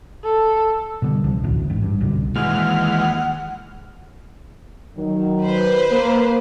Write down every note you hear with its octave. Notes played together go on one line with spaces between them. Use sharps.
A4
B2 D3 G3
C2 C#3 F3
A1 D2
A1 G#2
G2
C2 B2 D3
D#2 E3 G#3 F#5 F6
D#3 F#3
B4 C5
A#3